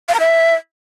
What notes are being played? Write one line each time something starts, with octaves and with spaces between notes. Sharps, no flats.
F5
A#5
E5